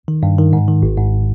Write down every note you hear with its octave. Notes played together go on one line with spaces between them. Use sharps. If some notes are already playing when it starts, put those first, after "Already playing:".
D#3
G2
D#3
G#2
D#3
G#1
G#2